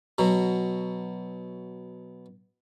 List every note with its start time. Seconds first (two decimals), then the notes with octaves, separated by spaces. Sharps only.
0.18 B2 F#3